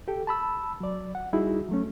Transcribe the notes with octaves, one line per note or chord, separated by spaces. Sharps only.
G4 A4 G5
A5 B5 E6
F#3 D5
F#5
G3 D#4 E4 F#4 G#4
F#3 A3 C#4